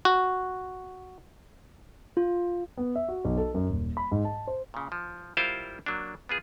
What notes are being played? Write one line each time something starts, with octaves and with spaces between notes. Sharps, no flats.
F#4
F4
B3
E5
F#4
B1
A4
F#2
D#1
B5
G#2
A5
C5
A#2 C#3
F3
G3 E4 F4 A#4 C5 F5
F#3 A#3 D4
B3 F4 G#4